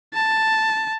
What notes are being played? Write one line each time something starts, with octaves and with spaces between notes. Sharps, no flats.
A5